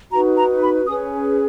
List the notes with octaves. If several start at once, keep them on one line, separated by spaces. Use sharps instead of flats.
D#4 F#4 B4 A#5
A#5
B5
C#4 G#4 B4 D#6